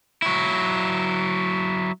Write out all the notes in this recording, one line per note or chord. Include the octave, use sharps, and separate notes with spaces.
F#3 E4